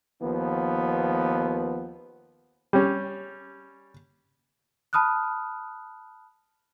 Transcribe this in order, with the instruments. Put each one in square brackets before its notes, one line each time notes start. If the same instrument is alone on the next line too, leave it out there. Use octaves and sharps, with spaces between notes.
[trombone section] D#2 F3 B3
[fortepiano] G3 C#4
[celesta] A5 B5 D#6 F6 F#6